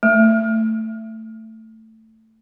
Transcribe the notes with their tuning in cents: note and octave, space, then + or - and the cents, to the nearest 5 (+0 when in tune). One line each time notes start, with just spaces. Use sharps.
A3 +15